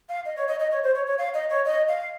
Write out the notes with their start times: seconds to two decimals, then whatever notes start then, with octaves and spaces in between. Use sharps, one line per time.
0.09 F5
0.25 D#5
0.36 C#5
0.48 D#5
0.60 D#5
0.71 C#5
0.83 C5
0.95 C#5
1.06 C#5
1.18 F5
1.34 D#5
1.50 C#5
1.65 D#5
1.88 F5